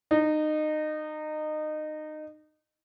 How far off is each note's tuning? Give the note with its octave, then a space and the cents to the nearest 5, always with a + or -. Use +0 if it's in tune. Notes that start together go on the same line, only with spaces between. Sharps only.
D#4 -25